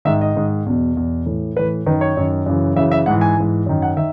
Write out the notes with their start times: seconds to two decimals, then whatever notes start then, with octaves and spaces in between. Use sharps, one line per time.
0.05 G#2 D#3 E5
0.21 D#5
0.35 G#2 D#3
0.66 E2 B2
0.97 E2 B2
1.26 A2 E3
1.56 A2 E3 B4
1.86 F#2 D#3 B4
2.01 C#5
2.17 F#2 D#3
2.46 F#2 C#3 E3
2.76 F#2 C#3 E3 E5
2.92 E5
3.06 G#2 E3 F#5
3.21 G#5
3.37 G#2 E3
3.66 F#2 D#3
3.82 F#5
3.97 D#3 E5